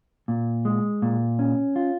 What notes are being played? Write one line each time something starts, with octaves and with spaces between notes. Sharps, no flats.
A#2
G#3
A#2
C#4
F4